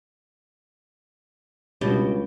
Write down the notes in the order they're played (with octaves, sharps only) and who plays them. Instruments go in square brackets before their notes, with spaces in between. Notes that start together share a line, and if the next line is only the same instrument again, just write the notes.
[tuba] C#2 [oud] B2 [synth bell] G3 D4 G4